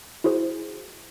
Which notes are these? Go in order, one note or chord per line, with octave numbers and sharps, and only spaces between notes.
E4 F#4 G#4 C5